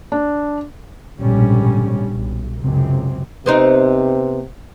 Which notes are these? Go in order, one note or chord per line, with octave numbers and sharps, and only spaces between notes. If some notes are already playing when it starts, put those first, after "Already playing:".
D4
A#1 G#2 B2 D3 G3 C#4
B1
C#2 F#2 C3 C4
C3 B3 C4 D#4